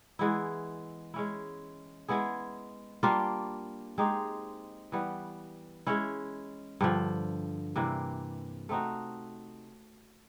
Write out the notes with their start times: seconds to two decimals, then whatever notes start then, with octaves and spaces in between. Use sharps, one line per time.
0.19 E3 G#3 B3 E4
1.14 G#3 C#4 E4
2.08 G#3 B3 E4 G#4
3.03 G3 A#3 D4 F4
3.98 G#3 C4 D#4 G4
4.92 E3 G3 B3
5.87 G#3 C#4 E4
6.81 G2 D3 F3
7.76 C3 E3 G3 A#3
8.69 A3 C4 D#4 F#4